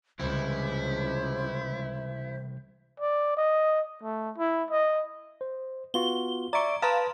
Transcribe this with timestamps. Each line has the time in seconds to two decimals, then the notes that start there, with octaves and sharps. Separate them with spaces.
0.20 C#2 C3 E3 G3 E4 C5
3.00 D5
3.37 D#5
4.03 A3
4.38 E4
4.71 D#5
5.41 C5
5.94 B3 F4 F#4 G7
6.53 D5 E5 A#5 C#6 D7
6.82 B4 F5 A5 A#5 C6 F6